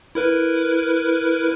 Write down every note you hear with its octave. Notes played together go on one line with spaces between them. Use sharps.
E4 A#4 B4